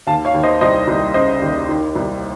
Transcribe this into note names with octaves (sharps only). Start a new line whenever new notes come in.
D#2 F5 A5
C#5 F5
D#2
C5 D#5
C2 C5 D#5
C2
C#3 C5 D#5
D#2
D#3
C2